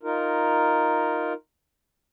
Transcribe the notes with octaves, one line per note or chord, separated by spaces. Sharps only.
D#4 F4 A#4